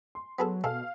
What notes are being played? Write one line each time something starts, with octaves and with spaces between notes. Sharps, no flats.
C6
F#3 B3 G#4 A4
B2 A4 F5 F6